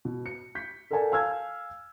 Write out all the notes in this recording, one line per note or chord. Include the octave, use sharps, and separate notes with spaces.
B2
C#7
G6 B6
A4 A#4 D5 F#5 G#5 A5
F5 G#5 E6 F6 G#6